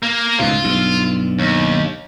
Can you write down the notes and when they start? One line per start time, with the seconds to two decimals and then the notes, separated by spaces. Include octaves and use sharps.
0.03 A#3
0.39 C#2 G#2 B2 F4
0.64 B1 G2
1.39 D#2